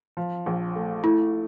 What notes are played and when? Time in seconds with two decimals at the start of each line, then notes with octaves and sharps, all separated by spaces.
0.17 F3
0.46 A#1
0.76 A3
1.04 A3 E4